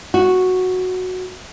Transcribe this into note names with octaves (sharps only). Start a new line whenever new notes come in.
F#4